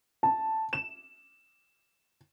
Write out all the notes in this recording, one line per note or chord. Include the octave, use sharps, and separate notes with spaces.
A5
E7